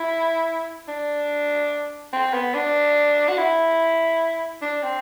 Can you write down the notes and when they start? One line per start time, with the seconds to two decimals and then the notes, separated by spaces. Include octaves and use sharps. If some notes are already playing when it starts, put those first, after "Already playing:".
Already playing: E4
0.88 D4
2.13 C4
2.34 B3
2.55 D4
3.28 F#4
3.38 E4
4.62 D4
4.83 C4